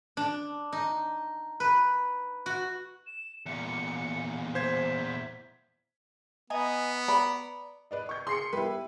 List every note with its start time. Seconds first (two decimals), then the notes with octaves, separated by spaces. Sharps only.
0.17 D4
0.73 D#4
1.60 B4
2.46 F#4
3.07 E7
3.46 E2 A#2 C#7
4.55 C5 G#6 B6
6.50 B3 D#5 G#5 A#5
7.08 D5 A#5 B5
7.91 B4 D5 D#5
8.09 C#6 G6
8.27 G#4 C6 C7 C#7
8.53 G3 B3 E4 B4